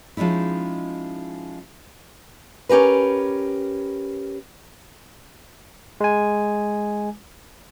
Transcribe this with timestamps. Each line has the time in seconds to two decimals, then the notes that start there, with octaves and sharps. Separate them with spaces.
0.17 F3 G#3 C#4 D#4 E4
2.69 C#4 G4 A#4 B4
6.01 G#3 G#5